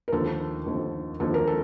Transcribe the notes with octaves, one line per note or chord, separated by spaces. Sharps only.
A#4
D#2 D3 F3 A4
D#2 D3 F3
D#2 D3 F3 A4
A#4
A4